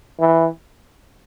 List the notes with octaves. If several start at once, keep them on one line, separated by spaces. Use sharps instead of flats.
E3